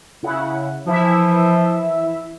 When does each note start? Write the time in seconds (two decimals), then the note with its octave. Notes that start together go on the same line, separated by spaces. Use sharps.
0.23 C#3 E4 F#5
0.86 E3 F3 E4 E5